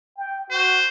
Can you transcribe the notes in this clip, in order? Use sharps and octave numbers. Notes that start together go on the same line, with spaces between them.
G5
F#4 C5